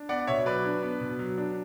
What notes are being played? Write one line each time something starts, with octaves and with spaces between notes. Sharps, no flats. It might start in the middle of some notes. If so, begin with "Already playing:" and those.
Already playing: D4
B3 D5 F#5
B2 C#5 E5
F#3 B4 D5
D4
B3
B2
F#3
D4